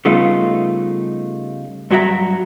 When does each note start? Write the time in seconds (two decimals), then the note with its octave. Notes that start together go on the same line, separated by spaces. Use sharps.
0.05 C#3 G3 A3 B3 D#4 F4
1.91 G2 F#3 F#4 G4 E5 A#5